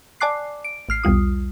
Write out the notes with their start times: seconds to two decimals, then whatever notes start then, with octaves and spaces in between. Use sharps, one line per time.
0.21 D5 G#5 A5 D6 F#6 C7
0.64 D7
0.89 A1 F6 C7
1.04 B1 E2 G3 F4 D#6